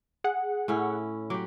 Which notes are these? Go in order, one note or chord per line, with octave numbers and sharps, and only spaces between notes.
G#4 F#5
A2 C#4 E4
F#3 G4 D6